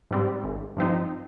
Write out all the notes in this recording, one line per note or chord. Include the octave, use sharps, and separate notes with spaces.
G#2 G3 C4
G#1
G2 F3 C4 D#4